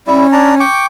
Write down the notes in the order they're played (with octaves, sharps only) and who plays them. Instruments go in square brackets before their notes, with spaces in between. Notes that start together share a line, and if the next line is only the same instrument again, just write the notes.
[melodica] G3 E4 [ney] C#4
[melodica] D4 A5 A#5
G5 C#6 D6